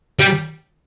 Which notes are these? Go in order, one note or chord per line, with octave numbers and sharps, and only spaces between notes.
G3